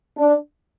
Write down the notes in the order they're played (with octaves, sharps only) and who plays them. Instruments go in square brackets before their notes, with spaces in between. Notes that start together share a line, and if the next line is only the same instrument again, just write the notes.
[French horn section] D4